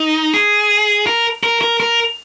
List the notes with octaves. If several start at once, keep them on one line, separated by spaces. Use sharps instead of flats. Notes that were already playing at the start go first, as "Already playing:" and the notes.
Already playing: D#4
G#4
A#4
A#4
A#4
A#4